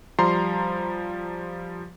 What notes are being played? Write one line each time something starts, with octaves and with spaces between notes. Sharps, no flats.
F3 G3 A#5 C6 C7